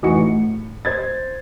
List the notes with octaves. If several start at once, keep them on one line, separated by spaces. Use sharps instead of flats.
F1 E3 D#4 F#4 C#7
A2
C5 G#6 A6